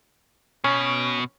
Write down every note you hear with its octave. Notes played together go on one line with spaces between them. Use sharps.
B2 C#4